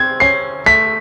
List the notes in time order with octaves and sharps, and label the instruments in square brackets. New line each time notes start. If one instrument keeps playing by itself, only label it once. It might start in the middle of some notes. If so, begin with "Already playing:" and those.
Already playing: [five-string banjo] C4 [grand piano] G#6
[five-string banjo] C#4 [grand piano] C7
[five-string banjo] A3 [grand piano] B6